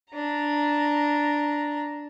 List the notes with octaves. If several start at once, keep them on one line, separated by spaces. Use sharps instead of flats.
D4 A#5